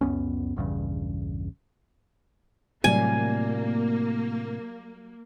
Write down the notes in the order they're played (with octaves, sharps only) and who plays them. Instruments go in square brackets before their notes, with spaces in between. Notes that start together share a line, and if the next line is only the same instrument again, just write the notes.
[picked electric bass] C#2 F#2 B3 C#4
A#1 E2 G2 C#3
[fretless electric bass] A2 C3 [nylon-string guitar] F#3 G3 D5 [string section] A#3 [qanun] G#5